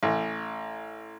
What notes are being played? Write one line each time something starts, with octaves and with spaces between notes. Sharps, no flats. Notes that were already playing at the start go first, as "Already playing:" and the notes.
A1